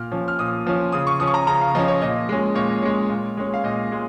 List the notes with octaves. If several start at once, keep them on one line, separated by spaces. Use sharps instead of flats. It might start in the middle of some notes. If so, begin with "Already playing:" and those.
Already playing: A#2 F6
F3 C#4
F6
A#2 D#6
F3 C#4
C#3 D#6
C#6
F3 C#4 D#6
C#6
A#5
C#3 A#5
F5
F3 C#4 D#5
C#5
A#2 D#5
G#3 C#4
A#2 C#5
G#3 C#4
A#2
G#3 C#4
F5
A#2 D#5
G#3